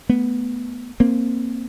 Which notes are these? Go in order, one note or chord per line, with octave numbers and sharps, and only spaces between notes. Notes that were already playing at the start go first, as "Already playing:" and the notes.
A3 B3
A#3 C4